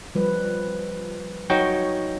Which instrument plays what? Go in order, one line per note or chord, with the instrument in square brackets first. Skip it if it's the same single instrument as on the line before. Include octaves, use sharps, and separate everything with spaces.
[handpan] F3 G3 B4
[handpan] F#3 C#5 [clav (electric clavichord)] D#4 F#4 G5